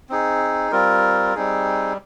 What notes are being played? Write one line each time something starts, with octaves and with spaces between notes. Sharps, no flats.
C4 D#4 G#4
G3 C4 F4 A#4
G3 C4 D#4 G#4